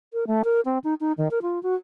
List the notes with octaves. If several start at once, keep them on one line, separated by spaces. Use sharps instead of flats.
A#4
A3
A#4
C4
D#4
D#4
D#3
A#4
F4
F#4